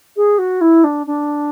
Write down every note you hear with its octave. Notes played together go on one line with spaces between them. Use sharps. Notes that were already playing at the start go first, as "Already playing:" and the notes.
G#4
F#4
E4
D4
D4